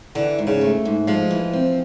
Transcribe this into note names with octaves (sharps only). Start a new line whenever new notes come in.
D3 E3
G#2
C#3
A3
G#2
F3 G#3
E3
C4